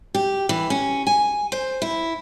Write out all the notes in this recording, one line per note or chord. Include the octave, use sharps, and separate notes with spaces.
G4
E3
C#4
G#5
C5
E4